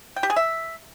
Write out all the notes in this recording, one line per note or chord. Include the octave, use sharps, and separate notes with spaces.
G5
G4
G#4
E5